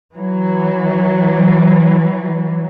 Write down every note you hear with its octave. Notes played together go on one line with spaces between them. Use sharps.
E3 F#3